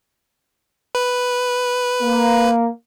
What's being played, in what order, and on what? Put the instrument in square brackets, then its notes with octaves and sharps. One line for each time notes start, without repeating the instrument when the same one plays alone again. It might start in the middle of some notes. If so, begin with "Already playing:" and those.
[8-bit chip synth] B4
[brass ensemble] A#3